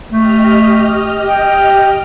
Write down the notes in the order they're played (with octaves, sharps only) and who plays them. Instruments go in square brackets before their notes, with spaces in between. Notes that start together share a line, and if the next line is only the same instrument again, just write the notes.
[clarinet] A3 [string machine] G4 D#5 F6
[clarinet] G5